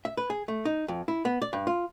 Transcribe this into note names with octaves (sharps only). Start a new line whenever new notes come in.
E5
B4
G#4
A3
D#4
F2
E4
B3
D5
G2
F4